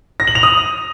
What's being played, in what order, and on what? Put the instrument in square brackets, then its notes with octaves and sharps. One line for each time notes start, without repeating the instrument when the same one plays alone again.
[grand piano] A#6
F#7
F7
D#6